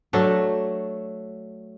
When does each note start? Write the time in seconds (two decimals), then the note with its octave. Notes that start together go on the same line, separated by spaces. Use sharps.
0.13 F#3 A3 D4 A4